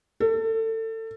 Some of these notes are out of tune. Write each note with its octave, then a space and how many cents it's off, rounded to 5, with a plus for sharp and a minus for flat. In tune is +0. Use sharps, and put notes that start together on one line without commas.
A4 +25